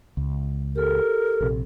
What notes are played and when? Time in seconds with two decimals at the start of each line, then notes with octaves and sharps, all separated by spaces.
0.17 C#2
0.76 G4 A4 A#4
1.41 A#1 C3